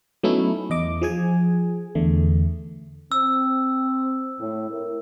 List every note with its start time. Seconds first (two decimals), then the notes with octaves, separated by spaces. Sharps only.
0.23 F#3 A3 B3 C#4 D#4 E4
0.70 E2 D#5 D6
1.02 F3 G#4 G#5
1.95 E2 D3 A3
3.12 C4 E6
4.39 A2
4.70 E4 A#4